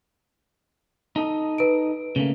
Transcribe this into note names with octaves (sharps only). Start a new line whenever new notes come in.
D#4 A4 D#5
B4 D7
C#3 A3 A#3